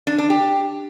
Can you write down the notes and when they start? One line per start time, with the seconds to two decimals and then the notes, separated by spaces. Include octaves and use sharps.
0.07 D4
0.18 D4
0.30 G4